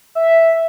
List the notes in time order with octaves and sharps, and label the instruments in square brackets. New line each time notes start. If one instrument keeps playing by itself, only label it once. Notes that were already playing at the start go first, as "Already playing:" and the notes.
[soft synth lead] E5